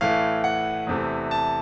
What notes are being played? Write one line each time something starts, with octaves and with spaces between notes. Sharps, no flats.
A2 E3 A3 F5
F#5
E2 C3 E3 A3
A5